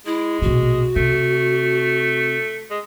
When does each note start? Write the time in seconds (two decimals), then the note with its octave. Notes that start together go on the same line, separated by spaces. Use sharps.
0.06 G#3 E4
0.42 A#1 B2 F#4
0.96 C3 A3
2.70 G#3